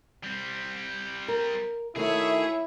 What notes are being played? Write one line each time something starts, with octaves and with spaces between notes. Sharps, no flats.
G3 C4
A#4
D#3 A3 E4 F#4 G#4 C#5 E5